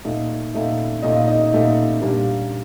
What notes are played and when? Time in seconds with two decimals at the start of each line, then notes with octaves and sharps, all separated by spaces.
0.05 A#2 A3 D#4
0.54 A#2 A3 D#4
1.02 A#2 A3 D#4 D#5
1.16 F5
1.27 D#4 D#5
1.52 A#2 A3 D#4
2.01 A#2 G3 A#3 D4